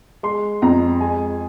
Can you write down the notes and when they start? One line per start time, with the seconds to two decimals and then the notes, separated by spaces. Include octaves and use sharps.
0.23 G#3 C6
0.62 F2 A#5
1.01 G#3 G#5